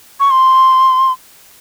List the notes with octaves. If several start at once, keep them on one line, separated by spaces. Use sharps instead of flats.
C#6
C6